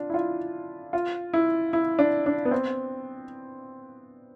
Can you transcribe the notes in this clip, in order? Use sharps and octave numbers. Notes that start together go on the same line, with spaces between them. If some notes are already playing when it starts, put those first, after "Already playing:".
Already playing: D4 F4
E4
F4
F4
E4
E4
D4
D4
B3
C4